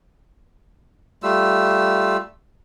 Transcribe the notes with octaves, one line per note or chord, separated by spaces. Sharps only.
G3 A3 F4 E6